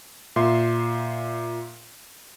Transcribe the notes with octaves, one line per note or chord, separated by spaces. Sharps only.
A#2 E5 C6